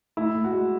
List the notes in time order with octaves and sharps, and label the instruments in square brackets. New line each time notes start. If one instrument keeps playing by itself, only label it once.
[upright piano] A2 E4
A2
F#4
G#3